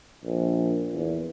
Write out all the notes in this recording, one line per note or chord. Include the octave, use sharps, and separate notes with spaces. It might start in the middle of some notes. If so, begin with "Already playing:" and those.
A#1
E2